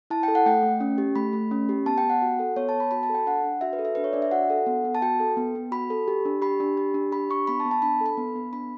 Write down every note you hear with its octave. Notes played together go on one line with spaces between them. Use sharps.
E4 A5
A4 G5
F#5
A3 G5
A3
C#4
G4
A3 B5
A3
C#4
G4
B3 A5
G5
B3
F#5
F#4
A4
B3 C#5
A5
B3
B5
F#4 B5
A5
A4
G5
D4 F#5
D4
F#4 E5
B4
A4
E5
D4 B4
C#5
D4 D5
E5
F#4 F#5
A4
B3
B3
A5
F#4 G5
A4
B3
B3
F#4 B5
A4
G4
D4
G4 B5
D4
G4
D4
G4 B5
D4 C#6
B3 B5
A5
B3
A5
D4 B5
A4 B5
B3
B3
D4 B5